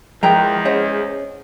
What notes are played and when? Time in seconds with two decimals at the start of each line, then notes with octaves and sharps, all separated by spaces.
0.23 E2 F3 G#3 A#4 G5 A#5
0.65 C#4 C5 D#5 F#5